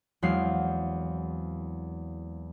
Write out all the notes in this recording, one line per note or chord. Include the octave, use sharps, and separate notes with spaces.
E2 F#3 G#3 C4 F5 C7